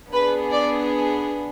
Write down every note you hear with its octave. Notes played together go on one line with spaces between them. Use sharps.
B3 D4 G#4 B4
D5